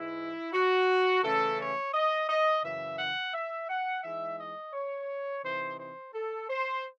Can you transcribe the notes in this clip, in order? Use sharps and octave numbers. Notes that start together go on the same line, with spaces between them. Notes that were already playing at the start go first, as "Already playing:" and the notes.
Already playing: G#2 E3 G#3 E4
F#4
C#3 E3 A3 C#4 E4 A4
C#5
D#5
D#5
F#2 C#3 E3 E5
F#5
E5
F#5
E3 G#3 D#4 E5
D#5
C#5
C3 E3 C4 D#4 C5
C5
A4
C5